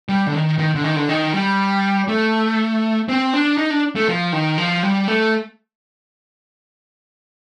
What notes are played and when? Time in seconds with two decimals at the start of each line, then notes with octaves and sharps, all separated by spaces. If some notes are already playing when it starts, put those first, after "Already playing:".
0.09 G3
0.27 D3
0.34 D#3
0.59 D#3
0.75 D3
0.84 D#3
0.96 D3
1.09 D#3
1.34 G3
2.08 A3
3.09 C4
3.34 D4
3.58 D#4
3.71 D4
3.95 A3
4.08 F3
4.33 D#3
4.58 F3
4.83 G3
5.08 A3